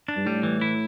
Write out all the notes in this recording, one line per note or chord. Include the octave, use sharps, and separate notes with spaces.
D4
G2
A2 G3
E3
E4